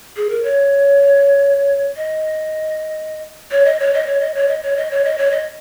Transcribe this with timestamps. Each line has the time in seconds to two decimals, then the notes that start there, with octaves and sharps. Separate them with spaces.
0.17 G#4
0.29 A#4
0.43 C#5
1.97 D#5
3.51 C#5
3.65 D#5
3.80 C#5
3.94 D#5
4.07 C#5
4.21 D#5
4.34 C#5
4.48 D#5
4.63 C#5
4.77 D#5
4.91 C#5
5.05 D#5
5.18 C#5
5.31 D#5